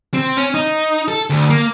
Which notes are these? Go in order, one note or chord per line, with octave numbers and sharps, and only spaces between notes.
C4
C#4
D#4
A4
D2
A#3